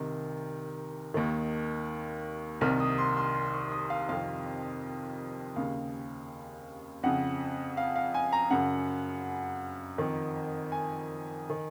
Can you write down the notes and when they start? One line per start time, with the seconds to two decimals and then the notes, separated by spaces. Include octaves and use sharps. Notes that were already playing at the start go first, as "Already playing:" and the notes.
Already playing: C2 C3 D#3
1.14 D#2 D#3
2.61 C2 C3 D#3 F6
2.80 D#6
2.98 C6
3.17 C6
3.35 C6
3.53 C#6
3.72 D#6
3.90 F5
4.09 F2 C3 D#3 F5
5.56 D#2 C#3 F5
7.03 F2 C#3 F#5
7.77 F5
7.96 F5
8.14 G#5
8.33 A#5
8.50 F#2 C#3 F#5
9.98 F2 D#3
10.72 G#5
11.50 D#3